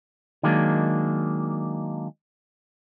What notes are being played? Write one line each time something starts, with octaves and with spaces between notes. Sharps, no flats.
D#3 F#3 G#3 A#3 D4